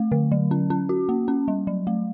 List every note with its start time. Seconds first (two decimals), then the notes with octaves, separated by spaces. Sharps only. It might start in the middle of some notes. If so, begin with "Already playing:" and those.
Already playing: A3
0.12 D3
0.32 F#3
0.51 C#4
0.70 C#4
0.89 F#4
1.09 A#3
1.28 C#4
1.48 G3
1.67 F#3
1.87 A3